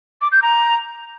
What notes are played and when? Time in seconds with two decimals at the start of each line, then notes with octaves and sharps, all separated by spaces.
0.22 D6
0.32 G6
0.42 A#5